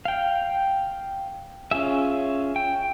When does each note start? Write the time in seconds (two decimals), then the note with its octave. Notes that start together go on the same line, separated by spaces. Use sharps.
0.05 F5 G5
1.71 C#4 F4 G#4 E5
2.56 G5